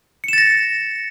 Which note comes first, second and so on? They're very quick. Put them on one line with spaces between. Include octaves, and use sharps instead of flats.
C#7 E7 A6 A#6